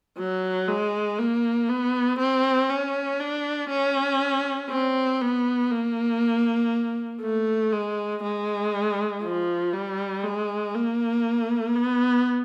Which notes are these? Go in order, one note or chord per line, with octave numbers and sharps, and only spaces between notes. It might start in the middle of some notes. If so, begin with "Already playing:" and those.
F#3
G#3
A#3
B3
C4
C#4
D4
C#4
C4
B3
A#3
A3
G#3
G#3
F3
G3
G#3
A#3
B3